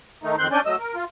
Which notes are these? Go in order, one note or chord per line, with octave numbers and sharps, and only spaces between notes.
D#3 A3 D#4
F2 D#3 C4 C6 F#6 G6
C#4 D4 D5 G#5 G6
F#3 A3 D#5 E6
A#4
F4